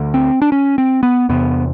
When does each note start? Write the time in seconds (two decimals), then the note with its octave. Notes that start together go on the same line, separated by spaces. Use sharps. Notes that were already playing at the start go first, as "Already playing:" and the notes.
Already playing: D2 D3
0.14 C4
0.42 D4
0.52 C#4
0.78 C4
1.03 B3
1.29 E2 C3 B3